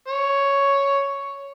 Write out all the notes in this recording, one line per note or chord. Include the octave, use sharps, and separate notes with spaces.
C#5